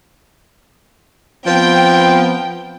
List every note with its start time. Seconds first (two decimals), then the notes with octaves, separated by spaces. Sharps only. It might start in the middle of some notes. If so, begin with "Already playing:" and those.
1.46 F3 B3 C4 G5